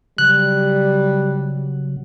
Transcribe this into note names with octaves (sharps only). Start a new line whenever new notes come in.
C#3 F#3 G3 F#6